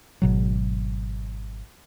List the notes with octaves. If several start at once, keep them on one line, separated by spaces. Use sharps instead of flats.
G#1 B2 F#3